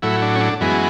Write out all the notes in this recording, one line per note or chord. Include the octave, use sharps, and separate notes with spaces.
A2 F#3 E4
D4
C#4
D4
F#2 E3 G#3 B3